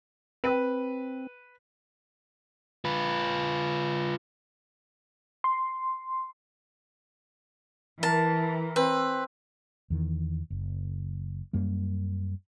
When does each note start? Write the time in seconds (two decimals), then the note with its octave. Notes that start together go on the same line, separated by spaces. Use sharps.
0.44 C4 B4
2.85 F4 B4
5.44 C6
8.03 E3 A#4 A5
8.76 C4 B4
9.90 E2 D#3 E3
10.50 F#1
11.53 F#2 G3 A#3